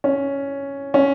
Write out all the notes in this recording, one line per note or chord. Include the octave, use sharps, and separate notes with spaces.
C#4
C#4